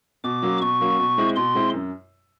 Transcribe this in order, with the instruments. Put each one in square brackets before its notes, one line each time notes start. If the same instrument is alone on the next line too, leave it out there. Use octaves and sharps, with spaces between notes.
[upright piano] B2 [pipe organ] D6
[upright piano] F#3 A#3 C#4
[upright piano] B2 [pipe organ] C#6
[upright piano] F#3 A#3 C#4
B2
G#3 C4 E4
[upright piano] B2 [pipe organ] C6
[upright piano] G#3 C4 E4
F#2